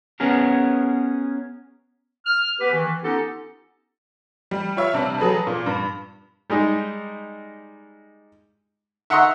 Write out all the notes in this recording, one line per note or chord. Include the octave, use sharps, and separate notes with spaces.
B3 C#4 G#4 A#4
F6
B3 G4 B4
D#3 E3
B3 C#4 D#4 F4 G4 A4
G3
F4 C#5 E5
C3 G3 D4
F#3 G#4 A4 B4
A#2
G2
G3 G#3 D#4
E5 F#5 A#5 C6 C#6 E6